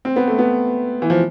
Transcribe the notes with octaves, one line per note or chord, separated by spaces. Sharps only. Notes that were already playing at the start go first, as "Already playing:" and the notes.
C4
B3
A3
B3
E3
F3